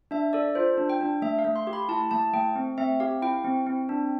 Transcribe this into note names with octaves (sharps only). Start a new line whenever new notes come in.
D4 E5
A4 D5
F4 C5
D4
G5
D4
A3 E5
F5
A3
C6
G4
B5
E4 A5
A3 A5
A3 G5
C4
C4 E5
G4 F5
E4 G5
C4
C4
D4